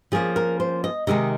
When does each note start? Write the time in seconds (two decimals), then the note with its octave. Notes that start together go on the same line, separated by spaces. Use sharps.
0.12 F3 A#3 C#4 G#4
0.36 A#4
0.60 C5
0.84 D#5
1.07 C3 D#3 G#3 D#4 D#5